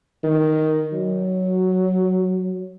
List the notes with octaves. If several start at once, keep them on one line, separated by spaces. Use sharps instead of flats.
D#3
F#3